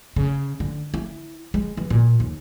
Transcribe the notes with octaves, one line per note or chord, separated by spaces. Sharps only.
C#3
D3
E4
G#3
E3
A#2
D#2